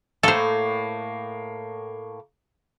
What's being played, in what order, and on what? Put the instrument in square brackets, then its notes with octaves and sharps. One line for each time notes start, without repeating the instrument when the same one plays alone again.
[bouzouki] A2 A#3 [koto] A4 C5